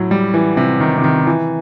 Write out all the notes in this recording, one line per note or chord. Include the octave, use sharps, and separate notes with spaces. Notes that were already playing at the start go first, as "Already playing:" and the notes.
Already playing: A2 F#3
G3
E3
C3
D#3
C3
D#3
E3